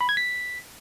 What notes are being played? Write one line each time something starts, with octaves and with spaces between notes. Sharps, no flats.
B5
G#6
B6